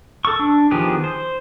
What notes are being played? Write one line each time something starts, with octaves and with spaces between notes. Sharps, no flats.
A4 C#6
D4
D#3 F3 B3 G4 G#4
C5